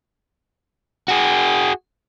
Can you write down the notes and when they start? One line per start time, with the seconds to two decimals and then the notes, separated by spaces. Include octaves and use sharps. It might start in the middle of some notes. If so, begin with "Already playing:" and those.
1.08 F#4 G#4